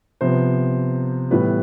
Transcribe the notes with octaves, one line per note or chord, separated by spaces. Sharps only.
C3 F3 B3 C5
A2 E3 G3 B3 B4